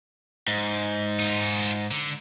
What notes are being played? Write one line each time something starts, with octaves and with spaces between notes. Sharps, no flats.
G#2
D#4 F4
D3